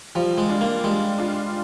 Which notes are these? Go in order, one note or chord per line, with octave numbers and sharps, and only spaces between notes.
F3 G3
G#3
D4 F4
A#3
G3 G#3
D4 F4